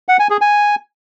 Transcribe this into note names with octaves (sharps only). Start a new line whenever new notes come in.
F#5
G#5
G#4
G#5